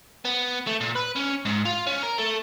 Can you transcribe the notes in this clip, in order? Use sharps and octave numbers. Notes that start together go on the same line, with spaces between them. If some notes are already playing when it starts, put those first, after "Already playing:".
B3
A3
A#2
B4
C#4
G#2
F4
C#4
A#4
A3